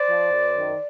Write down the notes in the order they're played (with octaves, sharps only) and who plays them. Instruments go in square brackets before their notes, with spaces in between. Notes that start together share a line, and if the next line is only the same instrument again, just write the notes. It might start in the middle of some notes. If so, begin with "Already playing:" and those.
Already playing: [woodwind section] C5 D5
F3
F#2
D#3